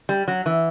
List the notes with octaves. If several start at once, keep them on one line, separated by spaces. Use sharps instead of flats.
G3
F#3
E3